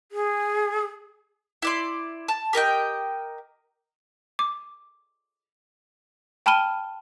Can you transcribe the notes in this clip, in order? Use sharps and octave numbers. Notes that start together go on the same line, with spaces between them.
G#4
E4 D5 C6
A5
G4 A#4 D#5 G5
D6
G5 A5 B5 F6 D#7 G7